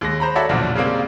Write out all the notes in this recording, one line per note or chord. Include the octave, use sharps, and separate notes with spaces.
D#2 G#3 A#6
C5 A#5 B5
F#4 A4 C#5 D5 E5
B1 E2 A#2 D3 F3
C#3 G3 G#3 A#3 C4